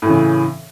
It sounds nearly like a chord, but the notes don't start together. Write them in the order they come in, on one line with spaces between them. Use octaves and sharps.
A2 E3 C#3